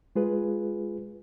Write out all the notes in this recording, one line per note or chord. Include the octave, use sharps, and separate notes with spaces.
G#3 F4 G#4 B4